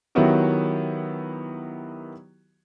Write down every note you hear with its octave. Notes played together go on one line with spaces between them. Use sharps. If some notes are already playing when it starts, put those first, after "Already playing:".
D#3 F#3 B3 E4 F#4 G4